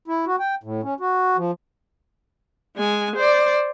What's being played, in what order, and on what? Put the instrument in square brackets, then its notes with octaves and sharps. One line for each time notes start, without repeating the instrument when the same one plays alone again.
[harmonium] E4
F#4
G5
A2
C#4
F#4
F3
[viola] G#3 G#5
C5 D5